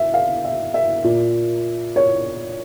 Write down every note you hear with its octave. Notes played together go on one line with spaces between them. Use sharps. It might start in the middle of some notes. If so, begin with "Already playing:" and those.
Already playing: E5
F5
E5
E5
A#2
C#5